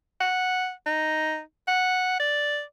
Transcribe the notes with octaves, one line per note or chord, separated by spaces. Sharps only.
F#5
D#4
F#5
D5